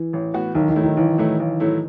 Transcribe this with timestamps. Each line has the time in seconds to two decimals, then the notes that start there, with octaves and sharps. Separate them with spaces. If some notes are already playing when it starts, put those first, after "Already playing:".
Already playing: E3
0.13 A1
0.34 A2 E3 B3 F#4
0.55 B1 D#3
0.69 D#3
0.76 A2 F#3 A3 E4
0.83 D#3
0.97 B1 E3
1.18 A2 F#3 A3 E4
1.40 B1
1.60 A2 F#3 A3 E4